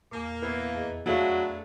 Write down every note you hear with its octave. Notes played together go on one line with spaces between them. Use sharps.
E2 A#2 A#3
E3 B3
F2 G#4 D#5
F#3 A3 B3 D4 E4 G#4 E5 F5